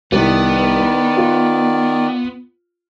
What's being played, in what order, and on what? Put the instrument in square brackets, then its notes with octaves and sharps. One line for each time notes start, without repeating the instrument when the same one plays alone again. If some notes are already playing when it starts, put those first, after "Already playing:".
[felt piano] C2 [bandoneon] D#3 D5 [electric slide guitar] B3
[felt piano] F4